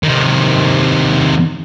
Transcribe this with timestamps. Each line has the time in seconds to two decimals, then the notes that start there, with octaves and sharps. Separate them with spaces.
0.03 C3 D#3